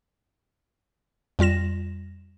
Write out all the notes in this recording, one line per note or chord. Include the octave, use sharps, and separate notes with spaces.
F2 G3 F4 A#6 E7